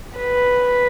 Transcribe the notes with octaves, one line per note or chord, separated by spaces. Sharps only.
B4